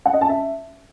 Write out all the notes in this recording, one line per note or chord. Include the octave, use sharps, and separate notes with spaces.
F#5
D#5
A5
E5